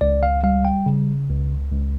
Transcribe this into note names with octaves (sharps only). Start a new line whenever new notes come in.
C#2 D5
F5
G3 F5
G5
C#3
C#2
C#2